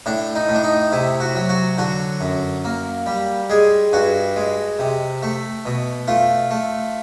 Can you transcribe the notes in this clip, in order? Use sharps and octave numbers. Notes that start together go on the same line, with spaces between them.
A2 D4
D#4
A2
D4
D#4
C3 E4
F#4
F#3
F#4
D3 F#4
F#2
A#3
G3
G#3 G#4
G2 F#4
G#3
C3
A3
B2
A3 F4
A3